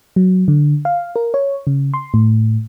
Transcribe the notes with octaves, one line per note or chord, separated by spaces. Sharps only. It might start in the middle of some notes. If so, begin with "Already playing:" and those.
F#3
D3
F5
A#4
C#5
C#3
C6
A2